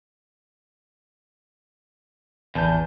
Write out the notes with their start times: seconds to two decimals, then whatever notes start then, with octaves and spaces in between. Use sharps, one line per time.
2.55 A1 E2 A5 G6